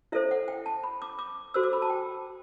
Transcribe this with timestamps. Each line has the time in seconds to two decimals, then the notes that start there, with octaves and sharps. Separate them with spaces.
0.12 E4 A4 C5 E5
0.31 F#5
0.48 G5
0.66 A5
0.83 B5
1.02 D6
1.19 D6
1.54 F#4 A4 C5 E6
1.63 D6
1.73 B5
1.82 A5
1.90 G5